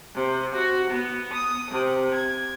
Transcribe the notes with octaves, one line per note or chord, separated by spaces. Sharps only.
C3
F#4
B3
D#6
C3
G#6